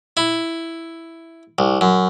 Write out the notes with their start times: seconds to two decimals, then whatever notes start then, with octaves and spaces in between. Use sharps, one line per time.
0.17 E4
1.59 C2
1.81 F#2